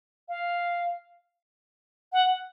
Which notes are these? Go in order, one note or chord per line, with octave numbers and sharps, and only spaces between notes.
F5
F#5